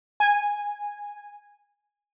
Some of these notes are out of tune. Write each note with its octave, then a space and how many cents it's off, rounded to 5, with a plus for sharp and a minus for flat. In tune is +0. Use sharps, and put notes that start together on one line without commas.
G#5 -10